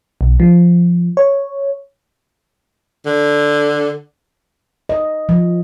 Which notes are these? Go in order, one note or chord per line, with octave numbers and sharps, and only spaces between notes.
B1
F3
C#5
D3
D#5
F3